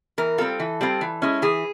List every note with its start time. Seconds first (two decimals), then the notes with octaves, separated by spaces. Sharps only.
0.18 E3 A#4
0.38 G3 C4 F4 A4
0.60 E3
0.81 G3 C4 F4
1.01 E3
1.22 G#3 C#4 E4
1.42 E3 G#4